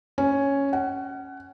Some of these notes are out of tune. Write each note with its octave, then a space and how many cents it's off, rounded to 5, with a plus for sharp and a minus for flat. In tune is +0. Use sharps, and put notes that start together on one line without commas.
C#4 +0
F#5 +25